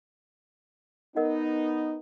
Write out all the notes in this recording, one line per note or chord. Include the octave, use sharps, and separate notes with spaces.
B3 D#4 A#4 D#5 F#5